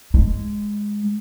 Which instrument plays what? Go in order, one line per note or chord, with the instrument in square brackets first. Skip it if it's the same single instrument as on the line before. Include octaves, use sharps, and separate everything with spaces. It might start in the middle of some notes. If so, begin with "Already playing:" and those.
[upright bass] G#3